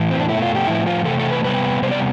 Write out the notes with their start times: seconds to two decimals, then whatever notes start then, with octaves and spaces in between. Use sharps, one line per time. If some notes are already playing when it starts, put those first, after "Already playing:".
Already playing: A2 E3
0.11 C4
0.20 D4
0.29 B2 A3 E4
0.43 F4
0.55 G4
0.67 A2 F3 A3 E4
0.87 F4
1.05 C3 E3 A3 A4
1.19 A4
1.31 B4
1.44 C3 G3 B3 B4
1.82 C3 G3 B3 C5
1.91 D5